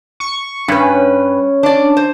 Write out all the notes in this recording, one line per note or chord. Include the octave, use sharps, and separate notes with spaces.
C#6
G2 C#4 B4
D4 D5
C5